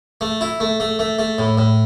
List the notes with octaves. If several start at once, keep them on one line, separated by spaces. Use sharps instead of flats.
A3
E4
A3
A3
A3
A3
A2
A2